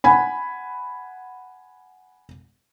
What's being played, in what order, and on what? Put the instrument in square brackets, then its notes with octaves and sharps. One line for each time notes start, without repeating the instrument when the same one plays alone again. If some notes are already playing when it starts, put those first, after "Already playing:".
[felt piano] F#5 G#5 B5